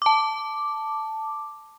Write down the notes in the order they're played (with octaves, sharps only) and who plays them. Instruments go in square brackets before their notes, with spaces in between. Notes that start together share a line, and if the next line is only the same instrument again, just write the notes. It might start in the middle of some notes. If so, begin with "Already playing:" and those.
[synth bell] A5 D6